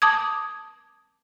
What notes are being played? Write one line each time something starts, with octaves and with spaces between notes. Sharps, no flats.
A5 D6 D#6 G#6